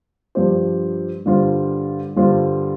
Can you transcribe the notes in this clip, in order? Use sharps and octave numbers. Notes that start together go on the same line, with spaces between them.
G2 F3 D4 G4 C5
G2 D3 G3 F4 C5
G2 D3 G3 F4 C5